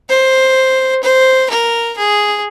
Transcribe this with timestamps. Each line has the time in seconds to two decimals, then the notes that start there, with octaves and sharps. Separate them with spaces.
0.09 C5
1.03 C5
1.50 A#4
1.98 G#4